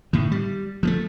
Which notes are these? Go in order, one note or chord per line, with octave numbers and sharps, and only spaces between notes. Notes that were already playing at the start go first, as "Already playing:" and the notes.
A2 D#3
G3
F3 G#3 A3